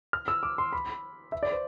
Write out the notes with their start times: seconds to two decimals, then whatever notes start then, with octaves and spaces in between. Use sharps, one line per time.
0.13 F6
0.28 E6
0.43 D6
0.58 C6
0.73 B5
1.32 E5
1.43 D5
1.52 C5